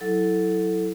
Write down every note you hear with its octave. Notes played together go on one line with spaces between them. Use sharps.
F#3 E4 A4